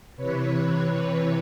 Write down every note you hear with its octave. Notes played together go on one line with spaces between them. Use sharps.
C3 E3 B4 C#5